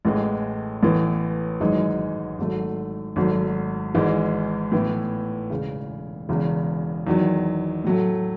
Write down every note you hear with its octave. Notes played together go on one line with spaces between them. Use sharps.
A1 A2 E3 G#3
A1 A2 E3 B3
G#1 F#2 E3 G#3 D#4
G#1 G#2 F#3 A3
G#1 G#2 F#3 A3
G#1 G#2 E3 G#3
A2 E3 B3 E4
E1 E2 C#3
E1 E2 C#3
E2 D#3 F#3
A2 F#3 A3